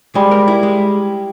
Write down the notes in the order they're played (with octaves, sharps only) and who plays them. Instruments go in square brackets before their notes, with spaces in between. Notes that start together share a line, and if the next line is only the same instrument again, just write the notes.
[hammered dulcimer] G3 [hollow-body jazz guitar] G#3
[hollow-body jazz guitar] A#4
E4
G#3